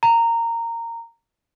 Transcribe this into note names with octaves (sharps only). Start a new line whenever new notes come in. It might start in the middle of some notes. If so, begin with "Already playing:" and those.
A#5